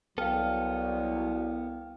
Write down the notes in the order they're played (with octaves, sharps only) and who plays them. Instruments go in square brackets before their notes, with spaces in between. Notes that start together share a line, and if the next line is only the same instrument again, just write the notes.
[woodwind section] C2 [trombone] F#3 [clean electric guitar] B3 A4 [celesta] F5 G5 F6